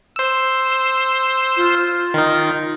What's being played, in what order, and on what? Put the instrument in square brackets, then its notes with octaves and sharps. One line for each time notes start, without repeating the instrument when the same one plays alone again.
[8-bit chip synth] C5 E6
[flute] F4
[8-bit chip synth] D#3 D#4